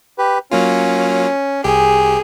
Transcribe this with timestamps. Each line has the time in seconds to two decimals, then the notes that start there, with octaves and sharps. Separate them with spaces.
0.18 G4 B4
0.51 F#3 A#3 C#4 F4
1.64 C2 G4 G#4